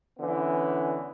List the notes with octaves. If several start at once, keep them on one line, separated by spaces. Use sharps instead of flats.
D3 E3 B3 C#4